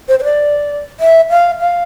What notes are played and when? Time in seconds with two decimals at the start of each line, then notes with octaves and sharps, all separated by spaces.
0.08 C5
0.19 C5
0.24 D5
1.00 E5
1.30 F5
1.60 F5